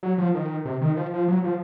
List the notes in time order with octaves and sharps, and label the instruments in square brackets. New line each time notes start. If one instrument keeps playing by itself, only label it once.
[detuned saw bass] F#3
F3
D#3
C3
D#3
F3
F3
F#3
F3